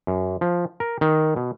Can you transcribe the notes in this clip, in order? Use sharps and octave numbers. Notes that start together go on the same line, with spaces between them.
F#2
F3
A#4
D#3
B2